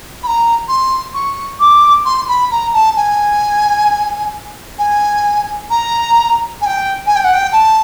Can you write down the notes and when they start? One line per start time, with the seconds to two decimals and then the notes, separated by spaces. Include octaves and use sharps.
0.23 B5
0.27 A#5
0.68 C6
1.14 C#6
1.60 D6
2.05 C6
2.28 B5
2.51 A#5
2.74 A5
2.96 G#5
4.79 G#5
5.70 A#5
6.61 G#5
6.66 G5
7.07 G#5
7.16 G5
7.24 F#5
7.34 G5
7.52 A5